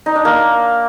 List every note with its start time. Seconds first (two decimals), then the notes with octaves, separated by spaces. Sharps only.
0.06 D#4
0.15 D4
0.25 A#3